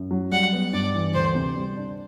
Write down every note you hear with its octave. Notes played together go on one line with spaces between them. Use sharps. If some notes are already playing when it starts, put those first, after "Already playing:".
Already playing: F#2
F#3
G3 F#5
B3
G2 D5
E3
D2 C5
C3
G3
D4